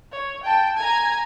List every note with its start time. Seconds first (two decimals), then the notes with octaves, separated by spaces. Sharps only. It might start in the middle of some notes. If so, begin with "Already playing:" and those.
0.12 C#5
0.43 G5 A5
0.77 G#5 A#5